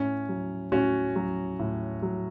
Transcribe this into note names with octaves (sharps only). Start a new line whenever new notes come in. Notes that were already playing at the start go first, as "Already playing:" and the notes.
Already playing: A2 C#4
F#3
A2 C#4 F#4
F#3
A2
F#3